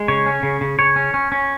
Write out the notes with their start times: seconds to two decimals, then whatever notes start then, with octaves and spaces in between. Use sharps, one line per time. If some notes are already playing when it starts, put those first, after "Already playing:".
Already playing: G#3
0.08 C#3 C#5
0.26 C#4
0.43 C#3
0.61 C#3
0.79 C#3 C#5
0.96 C#4
1.14 C#4
1.32 C#4